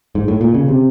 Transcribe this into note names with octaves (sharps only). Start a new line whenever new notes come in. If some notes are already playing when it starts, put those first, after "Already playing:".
G#2
A2
A#2
C#3
C3